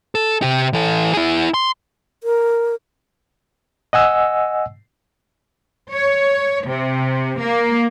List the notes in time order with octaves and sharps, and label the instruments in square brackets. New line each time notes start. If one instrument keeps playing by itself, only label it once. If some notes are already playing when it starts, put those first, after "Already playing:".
[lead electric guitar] A4
C3 G4
E3 A4
E4 G#4
C6
[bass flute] A#4
[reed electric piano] D#5 F#5 G#5 E6
[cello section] C#5
C3
A#3